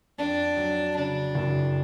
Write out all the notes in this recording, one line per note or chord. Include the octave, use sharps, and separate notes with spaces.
F2 D4
F#3
C#3 D4
F#1